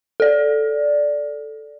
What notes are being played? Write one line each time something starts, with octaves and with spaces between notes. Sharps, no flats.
A4 D5